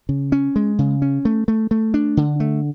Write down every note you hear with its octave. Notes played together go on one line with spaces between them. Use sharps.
C#3
C#4
G#3
C#3
C#4
A3
A3
A3
D4
D3
A3